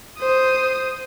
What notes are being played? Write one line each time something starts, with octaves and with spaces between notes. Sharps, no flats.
C5 D#6